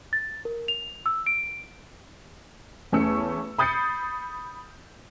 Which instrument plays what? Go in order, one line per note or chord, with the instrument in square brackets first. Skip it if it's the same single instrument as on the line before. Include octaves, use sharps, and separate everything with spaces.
[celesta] A6
A#4
F7
E6
D7
[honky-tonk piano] E2 A3 C#4 C#5 E6 C#7
B5 D#6 G6 A6 C7 C#7